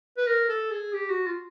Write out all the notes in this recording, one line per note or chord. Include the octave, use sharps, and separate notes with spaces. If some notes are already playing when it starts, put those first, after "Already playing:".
B4
A#4
A4
G#4
G4
F#4
F4